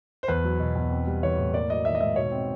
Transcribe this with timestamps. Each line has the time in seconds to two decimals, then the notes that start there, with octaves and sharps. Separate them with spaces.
0.23 C5
0.28 E2 B4
0.44 F#3
0.59 B2
0.75 E2
0.91 C4
1.07 G3
1.23 E3 C#5
1.38 A2
1.54 A#3 D5
1.70 F#3 D#5
1.85 D#3 E5
1.95 D#5
2.01 G#2 E5
2.16 B2 C#5
2.32 C4